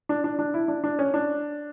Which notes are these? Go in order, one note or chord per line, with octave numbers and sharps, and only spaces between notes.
D4
D4
D4
E4
D4
D4
C#4
D4